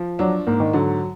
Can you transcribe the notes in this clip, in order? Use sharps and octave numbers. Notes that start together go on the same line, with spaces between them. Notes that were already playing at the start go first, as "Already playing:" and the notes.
Already playing: F3
F#3 D4
G#2 A#3
D#3
D3 F#3